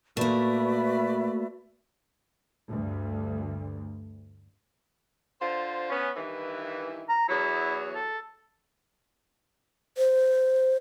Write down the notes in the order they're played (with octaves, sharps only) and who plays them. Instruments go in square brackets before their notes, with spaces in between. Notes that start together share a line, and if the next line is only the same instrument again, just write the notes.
[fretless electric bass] A#2 [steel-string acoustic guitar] A3 A#3 [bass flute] F#4 [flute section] B4 D5 E5
[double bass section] D2 G2
[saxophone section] D3 F4 C5
B3 C#4
G2 D#3 E3
[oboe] A#5
[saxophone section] E2 F#3 [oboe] E4
[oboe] A4
[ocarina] C5